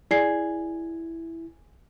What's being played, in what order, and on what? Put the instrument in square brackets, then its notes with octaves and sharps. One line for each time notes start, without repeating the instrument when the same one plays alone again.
[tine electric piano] E4 [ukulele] G#4 [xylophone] D5 C7